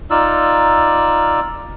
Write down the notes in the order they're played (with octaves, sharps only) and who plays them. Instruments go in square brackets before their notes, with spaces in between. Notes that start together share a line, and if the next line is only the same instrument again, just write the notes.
[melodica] D#4 F4 D5 E6